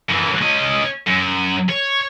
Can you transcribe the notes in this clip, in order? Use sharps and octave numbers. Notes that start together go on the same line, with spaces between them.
F#2 E3
C#4 D#5
F#2
C#5